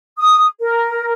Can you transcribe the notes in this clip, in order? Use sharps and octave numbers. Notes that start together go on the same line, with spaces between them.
D#6
A#4